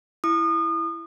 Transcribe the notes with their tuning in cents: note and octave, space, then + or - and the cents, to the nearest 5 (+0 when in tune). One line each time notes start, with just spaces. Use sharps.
E4 +5 D#6 -35